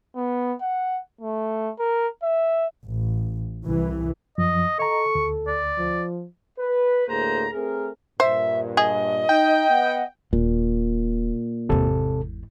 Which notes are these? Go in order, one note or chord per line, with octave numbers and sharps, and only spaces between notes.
B3
F#5
A3
A#4
E5
A1
C2 E3
F#2 F3 D#5
A4 D#5 A#5 C#6
D2
D5
F3
B4
D2 A2 A#3 G#4 C5 A#5
A3 C4 G#4 A#4
G2 A#2 C5 E5
G#4 D#5
D#4 G5
B3 F#5
D#1 A#2
G#1 E2 C3 A4